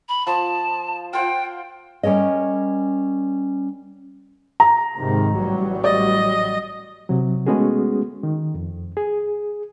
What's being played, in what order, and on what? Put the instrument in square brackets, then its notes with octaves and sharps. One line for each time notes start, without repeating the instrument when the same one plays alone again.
[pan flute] B5
[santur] F3 D#6 [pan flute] A5
[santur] F4 C5 F#5 [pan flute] G5
[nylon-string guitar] G3 C#4 A#4 C#5 D#5
[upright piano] A#5
[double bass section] G#2 C3 D#3
A1 F#3 G3
[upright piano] D5 [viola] D#5
[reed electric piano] C3 F#3
G#3 A3 B3 C#4 F#4 G#4
D#3
F2
G#4